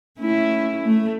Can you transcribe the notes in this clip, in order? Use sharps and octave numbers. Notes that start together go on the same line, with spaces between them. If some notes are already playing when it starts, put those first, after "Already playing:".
A3 C#4 E4
A3